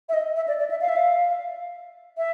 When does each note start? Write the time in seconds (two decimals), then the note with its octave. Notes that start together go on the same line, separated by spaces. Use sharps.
0.09 E5
0.14 D#5
0.36 E5
0.48 D5
0.59 D5
0.70 E5
0.81 F5
0.89 E5
0.96 F5
2.17 E5